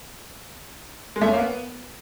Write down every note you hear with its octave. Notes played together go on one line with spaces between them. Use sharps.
G#3
A3
C#4
A#3
B3